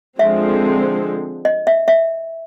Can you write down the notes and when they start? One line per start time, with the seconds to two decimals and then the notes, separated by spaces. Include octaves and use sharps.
0.19 D3 F3 G#3 C4 E5
1.45 D#5
1.67 E5
1.88 E5